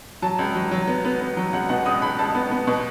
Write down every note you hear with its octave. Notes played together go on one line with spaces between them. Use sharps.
F#3 A5
C#2
F#3
F#3
B3
B3
B3
F#3
C#2 F#5
B2 F#5
C#2 D#6
C#2 B5
C#2 A5
B3
B3
B2